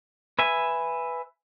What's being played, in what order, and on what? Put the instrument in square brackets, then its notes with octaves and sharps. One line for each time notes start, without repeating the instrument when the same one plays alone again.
[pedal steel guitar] B4 E5 G#5